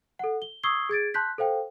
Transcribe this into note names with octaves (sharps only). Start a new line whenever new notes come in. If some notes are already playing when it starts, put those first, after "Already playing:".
A4 F#5
G7
C#6 D#6 E6 G#6 C7 G7
G#4 G#6 A6 D7
A5 C6 F#6 G6 B6
A4 C5 F5 G5